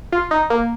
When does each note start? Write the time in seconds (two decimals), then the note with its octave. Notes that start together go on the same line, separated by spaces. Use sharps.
0.12 F4
0.31 D#4
0.50 A#3